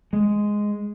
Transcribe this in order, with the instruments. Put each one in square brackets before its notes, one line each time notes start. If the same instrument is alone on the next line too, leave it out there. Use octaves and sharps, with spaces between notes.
[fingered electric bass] G#3